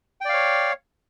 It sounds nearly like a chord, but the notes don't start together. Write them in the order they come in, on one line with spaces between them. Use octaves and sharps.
G5 D5 F5 C#5